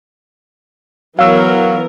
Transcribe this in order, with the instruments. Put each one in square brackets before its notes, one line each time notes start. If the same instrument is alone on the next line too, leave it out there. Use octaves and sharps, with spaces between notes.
[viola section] E3 B3 A#4 [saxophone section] F#3 [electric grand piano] F5 E6